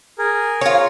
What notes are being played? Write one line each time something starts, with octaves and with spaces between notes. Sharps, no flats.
G#4 A#4
F4 C#5